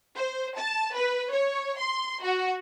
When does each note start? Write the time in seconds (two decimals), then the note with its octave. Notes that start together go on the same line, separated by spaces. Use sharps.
0.16 C5
0.57 A5
0.94 B4
1.32 C#5
1.78 C6
2.22 F#4